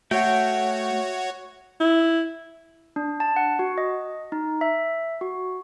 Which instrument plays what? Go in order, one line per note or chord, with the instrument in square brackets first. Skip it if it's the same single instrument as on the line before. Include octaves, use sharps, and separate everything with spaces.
[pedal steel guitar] A3 G5 [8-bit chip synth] F#4 C#5 [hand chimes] E5 F#5
[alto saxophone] E4
[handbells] D4
A5
F#5
F#4
D#5
D#4
E5
F#4